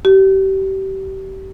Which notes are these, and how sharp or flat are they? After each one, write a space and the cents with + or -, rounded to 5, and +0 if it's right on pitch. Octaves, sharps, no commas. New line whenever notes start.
G4 -30